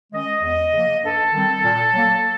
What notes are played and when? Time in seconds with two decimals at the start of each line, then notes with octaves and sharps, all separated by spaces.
0.13 D#3 G#3 C#4 D#5
0.42 E2 D#5
0.72 C#3 F3 A#3
1.03 G2 A4
1.33 D#3 G3 C4
1.64 A#2
1.94 F#3 A#3